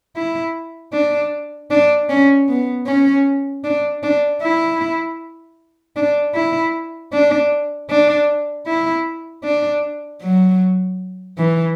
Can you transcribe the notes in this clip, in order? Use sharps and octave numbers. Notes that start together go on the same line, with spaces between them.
E4
D4
D4
C#4
B3
C#4
D4
D4
E4
D4
E4
D4
D4
E4
D4
F#3
E3